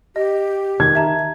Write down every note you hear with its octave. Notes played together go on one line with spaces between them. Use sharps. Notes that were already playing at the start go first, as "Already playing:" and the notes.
G4 D#5
D#3 G#6
E5 A5 A#5